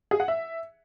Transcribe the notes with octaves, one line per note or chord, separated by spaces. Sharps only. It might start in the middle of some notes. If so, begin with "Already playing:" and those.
G#4
F#5
E5